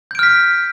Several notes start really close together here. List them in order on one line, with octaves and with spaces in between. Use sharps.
G6 D7 F6 B6